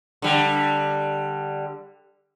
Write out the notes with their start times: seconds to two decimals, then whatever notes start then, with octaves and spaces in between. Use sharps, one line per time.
0.22 D3 G3